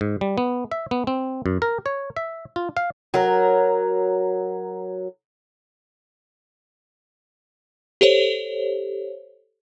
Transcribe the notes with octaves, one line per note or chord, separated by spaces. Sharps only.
G#2
G3
B3
E5
B3
C4
F#2
A#4
C#5
E5
F4
F5
F#3 A#4
G4 A4 C5 C#5